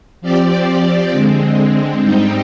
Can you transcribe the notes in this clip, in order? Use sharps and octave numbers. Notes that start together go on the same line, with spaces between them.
F3 C4 G4 D5
D3 G#3 C4
G#2 G3 C4 D#4 G4